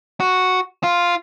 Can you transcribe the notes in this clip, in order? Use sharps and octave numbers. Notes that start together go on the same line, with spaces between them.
F#4
F4